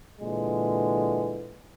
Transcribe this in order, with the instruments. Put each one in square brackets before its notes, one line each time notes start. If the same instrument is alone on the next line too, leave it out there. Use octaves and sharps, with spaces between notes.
[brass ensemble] A#2 D3 E3 G#3